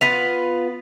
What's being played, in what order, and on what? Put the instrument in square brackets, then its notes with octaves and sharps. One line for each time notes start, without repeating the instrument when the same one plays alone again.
[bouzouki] B3 F4 B4 [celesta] B6 F7